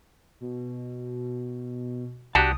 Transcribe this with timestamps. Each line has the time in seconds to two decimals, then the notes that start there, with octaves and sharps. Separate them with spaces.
0.40 B2
2.35 C2 D4 F#4 G4 A5 D#6